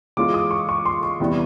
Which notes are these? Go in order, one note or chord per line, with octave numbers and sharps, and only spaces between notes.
E3 G#3 C#4 F4 D6
D#6
C#6
C#6
C6
C#6
E2 C3 E3 G3 B3